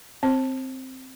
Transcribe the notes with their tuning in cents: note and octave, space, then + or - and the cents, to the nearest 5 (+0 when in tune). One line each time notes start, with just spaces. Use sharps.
C4 +0 C5 +40